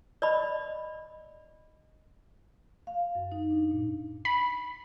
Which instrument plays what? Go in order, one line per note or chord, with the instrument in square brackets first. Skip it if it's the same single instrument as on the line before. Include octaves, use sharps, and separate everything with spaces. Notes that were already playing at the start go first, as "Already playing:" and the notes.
[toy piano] D5 D#5 B5
[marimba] F5
F#2
D#4
D4
A#2
[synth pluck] B5